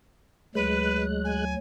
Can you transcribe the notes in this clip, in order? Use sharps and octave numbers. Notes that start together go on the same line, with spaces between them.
D2 F#3 G#3 B4 F#6
G#5